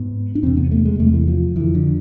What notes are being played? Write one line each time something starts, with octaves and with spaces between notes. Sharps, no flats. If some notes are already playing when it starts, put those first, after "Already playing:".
Already playing: G#2 B3
D4
E2 C3 C4
B3
A3
G#3
E2 C3 A3
E3
F3
F2 D3 E3
D3